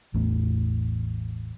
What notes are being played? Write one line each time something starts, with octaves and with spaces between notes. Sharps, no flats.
A1 E2 A2